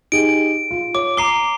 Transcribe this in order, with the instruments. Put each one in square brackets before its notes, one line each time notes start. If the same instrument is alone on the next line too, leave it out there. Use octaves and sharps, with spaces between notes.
[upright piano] D#4 G4 G#4 [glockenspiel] D7
[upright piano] F4
[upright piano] C#5 [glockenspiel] D6
[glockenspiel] A#5 C7 G7 [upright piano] D6 D#7